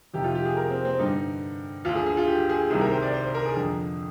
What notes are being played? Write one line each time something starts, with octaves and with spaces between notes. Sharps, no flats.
F2 C3 D#3 G4
F4
G4
G#4
A#4
C4
C4
G2 D3 D#4
D2 D3 F4
G#4
G#4
F4
G4
G#4
C2 C3 D#3 G#4
A#4
C5
D5
C5
C5
A#4
G#4
F2 D3